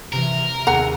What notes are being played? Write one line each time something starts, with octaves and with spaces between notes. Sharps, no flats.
C3 E3 A#4
D#2 G#4 F#5 A#5 E6